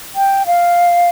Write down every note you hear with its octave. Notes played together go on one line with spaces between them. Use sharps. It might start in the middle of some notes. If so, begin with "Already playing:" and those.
G5
F5